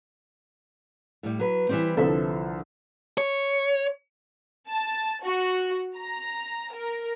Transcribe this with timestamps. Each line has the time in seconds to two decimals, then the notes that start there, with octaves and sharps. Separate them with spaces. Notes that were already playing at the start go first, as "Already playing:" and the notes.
1.23 A2 G3
1.39 F#3 B4
1.69 E3 G3 C4
1.97 C2 D3 F3 A4 E5
3.18 C#5
4.68 A5
5.24 F#4
5.96 A#5
6.73 A#4